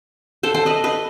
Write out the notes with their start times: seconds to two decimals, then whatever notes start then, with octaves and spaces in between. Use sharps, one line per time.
0.43 A4 C5
0.54 A4 C5
0.66 B4 D#5
0.84 B4 D#5